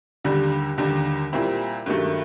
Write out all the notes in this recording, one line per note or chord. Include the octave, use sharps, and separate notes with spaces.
D#2 D3 G3
D#2 D3 G3
A#2 G3 C4 E4
G2 D#3 F#3 A3